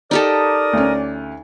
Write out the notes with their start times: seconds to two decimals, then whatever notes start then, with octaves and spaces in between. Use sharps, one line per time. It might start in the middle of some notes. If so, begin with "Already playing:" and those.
0.11 D#4 G4 A4 A#4 D5 D#6
0.73 D2 C#4